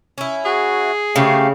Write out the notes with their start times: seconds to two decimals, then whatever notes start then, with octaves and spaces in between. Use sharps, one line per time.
0.18 C#4 E4
0.45 F#4 G#4
1.16 C#3 A3 C4 G4 F5